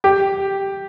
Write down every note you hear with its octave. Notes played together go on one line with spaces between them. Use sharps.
G4